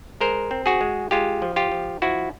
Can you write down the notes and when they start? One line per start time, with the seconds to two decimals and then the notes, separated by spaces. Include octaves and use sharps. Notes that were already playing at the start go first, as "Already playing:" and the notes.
0.21 G#3 A#4 C5
0.51 C4
0.66 F#4 G#4
0.81 G#3
1.11 G#3 F4 G4
1.42 F3
1.56 F4 G4
1.72 F3
2.02 F3 E4 F#4